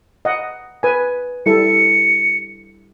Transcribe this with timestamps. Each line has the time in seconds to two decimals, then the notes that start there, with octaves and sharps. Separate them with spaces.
0.25 D#5 F#5
0.83 B4 G#5
1.46 G3 E4 A4 C#7